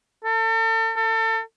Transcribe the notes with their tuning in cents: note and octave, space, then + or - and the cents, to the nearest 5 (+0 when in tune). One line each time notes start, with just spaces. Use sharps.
A4 +40
A4 +30